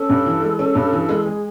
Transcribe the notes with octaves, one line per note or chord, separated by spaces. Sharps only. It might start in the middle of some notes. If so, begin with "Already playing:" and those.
Already playing: C#4 A4
G2
E3
G#3
C#4
G2
E3
G#3
G#3 G#4